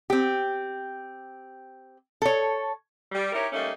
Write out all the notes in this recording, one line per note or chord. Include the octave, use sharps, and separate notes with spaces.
C4 G4
A4 C#5
G3
D#4 E4 G4 A#4 C#5
G3 A3 A#3 C#4 D#4